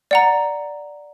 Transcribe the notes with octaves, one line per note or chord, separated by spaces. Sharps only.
D5 F#5 A#5